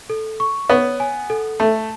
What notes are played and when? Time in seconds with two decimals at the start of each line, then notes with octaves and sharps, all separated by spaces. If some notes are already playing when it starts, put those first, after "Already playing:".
0.10 A4
0.40 C#6
0.70 B3 C#5
1.00 G#5
1.30 A4
1.60 A3 A5